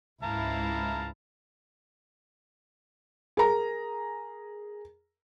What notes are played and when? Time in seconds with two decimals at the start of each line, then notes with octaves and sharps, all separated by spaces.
0.23 C#2 G#2 E4 F5 A5 A#5
3.37 G#4 A#4 A#5